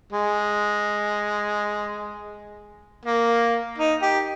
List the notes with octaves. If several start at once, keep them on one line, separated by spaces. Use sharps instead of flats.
G#3
A#3
D#4
G4